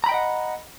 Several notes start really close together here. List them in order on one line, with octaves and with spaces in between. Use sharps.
A#5 B5 G5 D#5 F#5